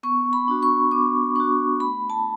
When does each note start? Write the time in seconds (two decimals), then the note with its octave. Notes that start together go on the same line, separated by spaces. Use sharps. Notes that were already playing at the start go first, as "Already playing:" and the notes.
0.03 B3 C#6
0.33 B5
0.48 D4 F#4
0.63 C#6
0.91 B3 D6
1.36 D4 F#4 C#6
1.80 A3 B5
2.10 A5